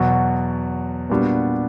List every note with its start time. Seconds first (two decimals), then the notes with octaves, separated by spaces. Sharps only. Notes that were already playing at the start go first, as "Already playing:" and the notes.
Already playing: E2 B2 F#3 B3 F#4
1.10 A#2 G3 B3 D4 F#4